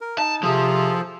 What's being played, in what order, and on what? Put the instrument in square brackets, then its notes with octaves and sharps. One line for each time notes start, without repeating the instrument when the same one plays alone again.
[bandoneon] A#4
[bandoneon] D#4 [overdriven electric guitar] A5
[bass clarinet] C3 [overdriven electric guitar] F3 [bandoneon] F4 G#4 A4